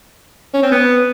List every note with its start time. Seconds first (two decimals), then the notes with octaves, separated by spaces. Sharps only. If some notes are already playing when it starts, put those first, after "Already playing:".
0.53 C#4
0.62 C4
0.71 B3